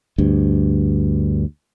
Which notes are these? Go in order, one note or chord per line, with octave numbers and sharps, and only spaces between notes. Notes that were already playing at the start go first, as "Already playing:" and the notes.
D2 G2